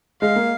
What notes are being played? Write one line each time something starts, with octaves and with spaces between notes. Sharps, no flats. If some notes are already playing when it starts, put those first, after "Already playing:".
G#3 F5
A#3